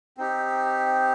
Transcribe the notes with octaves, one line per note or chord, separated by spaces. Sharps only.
C4 D#4 G4